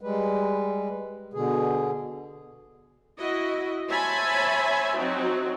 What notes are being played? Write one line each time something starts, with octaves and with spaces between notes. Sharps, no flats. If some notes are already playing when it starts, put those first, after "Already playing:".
G3 G#3 B4
B2 D3 G#4
E4 F#4 D#5
C5 C#5 E5 G#5 A5 B5
F#3 C4 D#4 F#4